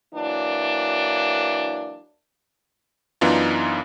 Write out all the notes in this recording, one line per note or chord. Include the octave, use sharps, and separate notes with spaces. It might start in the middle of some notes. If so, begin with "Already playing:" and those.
E3 F#3 A#3 D4
F#2 E3 B3 D4 D#4 F4